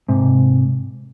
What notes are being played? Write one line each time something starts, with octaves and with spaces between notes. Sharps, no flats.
G#2 C3